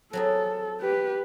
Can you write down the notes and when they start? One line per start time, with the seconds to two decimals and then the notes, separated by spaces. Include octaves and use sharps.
0.13 F#3 C4 G#4 A4
0.81 G4 B4